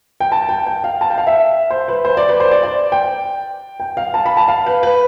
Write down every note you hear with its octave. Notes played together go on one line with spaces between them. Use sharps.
G5
A5
G5
G5
F5
A5
G5
F5
E5
C5
B4
C5
D5
B4
C5
D5
D5
G5
G5
F5
A5
B5
A5
F5
B4
B4